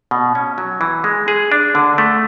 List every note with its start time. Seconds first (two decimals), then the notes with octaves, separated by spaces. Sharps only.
0.11 B2
0.35 C#4
0.58 F#3
0.81 E3
1.04 G#3
1.28 G#4
1.52 D4
1.75 D3
1.98 A3